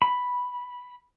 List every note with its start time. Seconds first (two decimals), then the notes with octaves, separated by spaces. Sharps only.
0.02 B5